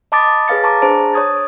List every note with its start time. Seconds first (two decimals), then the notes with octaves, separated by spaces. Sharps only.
0.12 D#5 A5 B5 D6 D#6 A6
0.48 G#4 B4 C#5 F5 A6 C#7
0.64 A5 A#5 C#6 D6
0.82 D4 G#4 C5 A5 A#5
1.13 C#5 C#6 D#6 G#6 A6